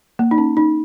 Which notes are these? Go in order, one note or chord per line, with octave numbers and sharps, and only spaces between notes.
A#3
D#4
C#4
D#4